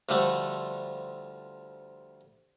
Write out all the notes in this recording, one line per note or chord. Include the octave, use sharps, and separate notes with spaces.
D2 D3 F3 G3 A3